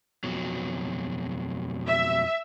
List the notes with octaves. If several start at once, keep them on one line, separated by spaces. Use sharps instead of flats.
F2 B2 F#3
E5